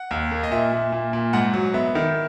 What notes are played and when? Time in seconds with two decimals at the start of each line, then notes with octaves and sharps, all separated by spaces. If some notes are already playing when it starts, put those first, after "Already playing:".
Already playing: F#5
0.11 D#2
0.31 A#3
0.43 D#5
0.51 A#2 E5
0.73 A#2
0.92 A#2
1.13 A#2
1.33 G#2 F#5
1.54 F#3
1.74 B3 E5
1.95 D#3